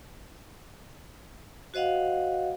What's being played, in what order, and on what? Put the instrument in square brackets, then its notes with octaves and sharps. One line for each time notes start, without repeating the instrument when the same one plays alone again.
[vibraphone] F#4 C5 D#5 F5 F#5